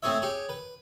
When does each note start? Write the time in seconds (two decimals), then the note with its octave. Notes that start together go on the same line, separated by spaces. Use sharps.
0.03 A3 C4 G#4 C#5 E5
0.22 G4 G#4 C#5
0.49 B4